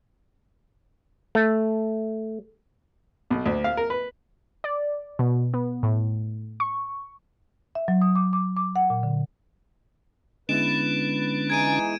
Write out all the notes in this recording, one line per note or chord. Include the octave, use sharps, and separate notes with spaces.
A3
B1
D2
F5
A#4
B4
D5
B2
B3
A2
C#6
E5
F#3
D#6
D6
D6
D6
F#5
A#2
D3
D3 G#3 B3 C#4 D4 E4 B4 E7
E3 D#4 G#4 G#6 D7 D#7